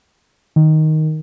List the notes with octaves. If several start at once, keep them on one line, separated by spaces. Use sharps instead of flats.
D#3